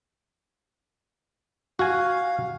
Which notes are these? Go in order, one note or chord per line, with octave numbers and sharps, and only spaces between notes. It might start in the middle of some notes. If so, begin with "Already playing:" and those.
F#4 F5 G#5